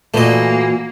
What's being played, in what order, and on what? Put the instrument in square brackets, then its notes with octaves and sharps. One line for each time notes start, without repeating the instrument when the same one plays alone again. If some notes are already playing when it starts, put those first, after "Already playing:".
[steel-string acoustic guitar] A#2 E3 F#4 [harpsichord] A3 D#5 [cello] A#3